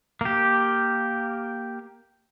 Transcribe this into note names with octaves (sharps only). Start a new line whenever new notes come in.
A#3 G4